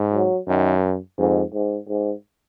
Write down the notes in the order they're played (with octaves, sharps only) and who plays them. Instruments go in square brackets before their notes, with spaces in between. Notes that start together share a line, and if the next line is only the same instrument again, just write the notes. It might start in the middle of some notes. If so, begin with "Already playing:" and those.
Already playing: [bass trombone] G#2
[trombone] F#3
[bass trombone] F#2 [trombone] D#3
[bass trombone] F2 [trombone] G#2
[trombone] G#2
G#2